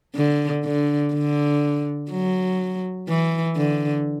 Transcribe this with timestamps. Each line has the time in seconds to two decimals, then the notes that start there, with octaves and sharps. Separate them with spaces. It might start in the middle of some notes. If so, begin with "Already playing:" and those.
0.15 D3
0.64 D3
1.13 D3
2.11 F#3
3.08 E3
3.56 D3